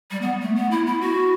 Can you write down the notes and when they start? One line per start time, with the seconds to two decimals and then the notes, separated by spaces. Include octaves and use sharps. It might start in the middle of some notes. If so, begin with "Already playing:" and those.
0.11 G3
0.21 B3
0.42 A3
0.56 B3
0.71 E4
0.87 E4
1.01 F#4